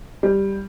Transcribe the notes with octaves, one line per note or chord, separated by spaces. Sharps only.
G3